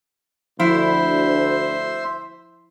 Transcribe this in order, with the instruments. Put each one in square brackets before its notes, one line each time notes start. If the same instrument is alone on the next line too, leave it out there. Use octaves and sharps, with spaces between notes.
[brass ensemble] D2 [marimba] F3 [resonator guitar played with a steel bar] E4 [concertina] C5 E5 C6